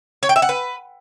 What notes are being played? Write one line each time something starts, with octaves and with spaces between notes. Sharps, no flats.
C#5
G5
E5
F#5
B4